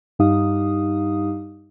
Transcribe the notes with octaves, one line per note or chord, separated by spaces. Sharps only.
G2 G3 D#4 G4 F5 D#6